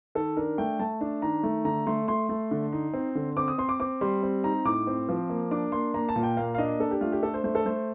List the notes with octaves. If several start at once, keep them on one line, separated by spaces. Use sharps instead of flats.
D#3 A4
D4 A#4
A3 G5
A3 A5
D4
D#3 A#5
A3
D3 A#5
A3 C6
A3 C6
A3
D3
D#4
C4
D3
C4 D6
D#6
C4 C6
D6
C4 D6
G3 C6
C4
D#4 A#5
A2 D6
C4
F3
A#3
D4 D6
A#3 C6
A#3 A#5
A5
A#2
G5
A#3 F5
F5
D4 D#5
D4 A4
G4
A3 F4
G4
D4 A4
C5
A3 C5
A4
A3 C5